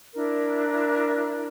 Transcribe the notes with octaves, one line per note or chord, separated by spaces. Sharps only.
D4 E4 A#4